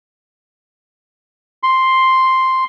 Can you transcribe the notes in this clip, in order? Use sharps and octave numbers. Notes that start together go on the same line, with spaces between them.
C6